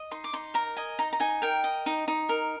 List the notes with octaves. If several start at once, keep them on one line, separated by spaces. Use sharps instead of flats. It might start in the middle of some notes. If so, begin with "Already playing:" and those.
Already playing: D#5
D#4 C6
D6
D#4 C6
A#4 A#5
D#5 G#5
D#4 A#5
A#5
D#4 G#5
A#4 G5
D#5
D#4
D#4
A#4